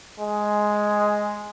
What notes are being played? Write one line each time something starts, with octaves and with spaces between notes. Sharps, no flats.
G#3